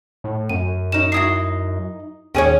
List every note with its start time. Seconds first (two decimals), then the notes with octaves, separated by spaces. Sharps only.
0.24 A2
0.49 F#2 D#7
0.92 C#4 D#4 E7
1.12 D#4 E4 F#4 D#6 C7
2.35 D#2 C#4 G#4 C#5 G5 G#5